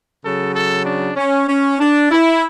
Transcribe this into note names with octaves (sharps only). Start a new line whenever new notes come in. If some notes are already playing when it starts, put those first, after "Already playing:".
C#3 F#3 A4
A4
D4
C#4
C#4
D4
E4